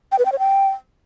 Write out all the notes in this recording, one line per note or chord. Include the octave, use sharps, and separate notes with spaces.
G5
B4
G5
C#5
G5